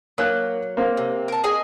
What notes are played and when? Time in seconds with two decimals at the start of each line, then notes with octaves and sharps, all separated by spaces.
0.18 F#3 A#3 F#6
0.77 A#3 C4
0.97 C3
1.28 A#4 A5
1.44 G#4 D#5 G#5